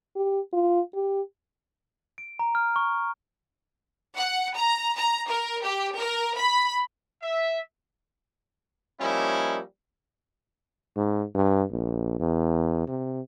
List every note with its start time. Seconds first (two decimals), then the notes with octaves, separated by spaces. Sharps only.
0.16 G4
0.53 F4
0.94 G4
2.18 D7
2.39 A#5
2.55 F6
2.76 C#6
4.16 F#5
4.56 A#5
4.97 A#5
5.29 A#4
5.63 G4
5.97 A#4
6.36 B5
7.22 E5
9.01 F3 G3 A#3 C#4 D#4 E4
10.96 G#2
11.35 G2
11.71 A#1
12.20 E2
12.88 C3